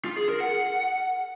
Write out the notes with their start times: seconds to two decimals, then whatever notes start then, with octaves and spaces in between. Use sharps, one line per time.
0.05 F4
0.17 G#4
0.29 A#4
0.41 F#5